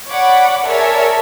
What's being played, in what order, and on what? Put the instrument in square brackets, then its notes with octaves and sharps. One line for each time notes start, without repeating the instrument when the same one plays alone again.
[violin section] C#5 D5 F#5 B5 D6
G#4 A#4 C#5 D5 E5 A5